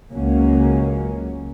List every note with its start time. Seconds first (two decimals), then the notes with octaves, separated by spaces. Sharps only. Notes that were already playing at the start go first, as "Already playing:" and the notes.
0.11 C#2 C#3 F#3 A#3 C#4